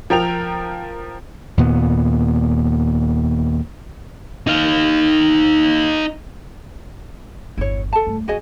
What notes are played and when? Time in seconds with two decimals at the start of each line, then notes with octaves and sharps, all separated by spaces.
0.10 F3 A#4 G5 F7
1.57 D#2 A#2 B3
4.47 D#4 F5
7.58 G1 E2 E4 C#5
7.93 A4 A5
8.07 G2 A3
8.28 A1 C4 F#4 G#4 D#5